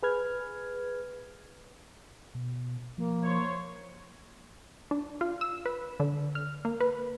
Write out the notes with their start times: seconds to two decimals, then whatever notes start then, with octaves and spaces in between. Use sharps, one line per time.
0.03 G#4 B4 F6 G#6
2.35 B2
2.98 F3 A#3
3.23 E4 C5 C#5
4.91 D4
5.21 F4
5.41 E6
5.66 B4
6.00 D3
6.35 F6
6.65 A#3
6.81 B4